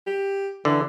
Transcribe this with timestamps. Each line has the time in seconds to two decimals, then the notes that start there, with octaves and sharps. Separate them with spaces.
0.07 G4
0.65 D3 E3